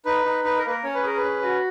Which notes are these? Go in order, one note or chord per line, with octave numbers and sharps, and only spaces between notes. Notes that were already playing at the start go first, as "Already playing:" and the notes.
D#4 B4
D#4
D#4 B4
A#4
A#3 B4
A#4
C#4 C#5
B4
G#4 A#4
B4
C#4
F#4